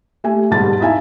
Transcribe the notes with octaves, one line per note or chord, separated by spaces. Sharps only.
A3 G4 G#5
E1 E2 G#2 G3 A5 A6
D#4 E4 E5 F5 G#5 A5